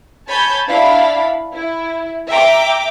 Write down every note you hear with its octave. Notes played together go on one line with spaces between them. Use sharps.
C#5 G#5 A5 B5 G6
D4 E4 F5 B5
E4
E5 G5 A#5 D6